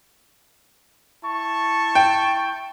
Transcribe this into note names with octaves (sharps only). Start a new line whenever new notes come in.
E4 A5 C#6
G5